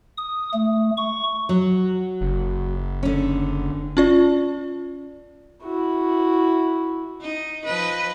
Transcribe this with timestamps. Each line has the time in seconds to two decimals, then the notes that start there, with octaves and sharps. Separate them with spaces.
0.18 D#6
0.54 A3
0.97 C#6
1.49 F#3
2.21 F#1
3.03 D3 C#4
3.97 C#4 F4 D5
5.63 E4 F#4
7.21 D#4
7.64 F3 B4 D#5